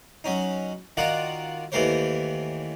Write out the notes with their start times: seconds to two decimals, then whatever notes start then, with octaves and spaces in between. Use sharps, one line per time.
0.24 F#3 C#4 D#4
0.97 D#3 F4 F#4 D5 F#5 A#5
1.72 D#2 E3 A3 A#4 C5 C#5